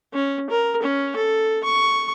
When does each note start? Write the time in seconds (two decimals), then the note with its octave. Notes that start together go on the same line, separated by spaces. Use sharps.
0.14 C#4
0.50 A#4
0.83 C#4
1.16 A4
1.64 C#6